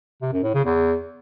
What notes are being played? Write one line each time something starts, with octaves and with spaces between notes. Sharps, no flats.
C3
F#2
A2
C#3
E2